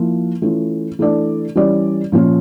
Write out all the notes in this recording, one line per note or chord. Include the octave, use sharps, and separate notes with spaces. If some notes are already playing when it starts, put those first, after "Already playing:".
Already playing: F3 A#3 E4
E3 A3 C#4 F4
E3 A3 D4 A4 D5
E3 G3 C#4 G4 D5
A#2 F3 C#4 F4